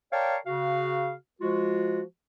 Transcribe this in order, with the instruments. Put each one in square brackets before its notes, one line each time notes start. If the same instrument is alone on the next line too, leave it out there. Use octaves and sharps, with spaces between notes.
[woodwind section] A#4 C#5 D5 F5 G5 A5
C#3 F#4 F5
F3 G#3 F4 F#4